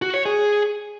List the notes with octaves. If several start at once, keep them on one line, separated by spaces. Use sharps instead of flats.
F#4
C#5
G#4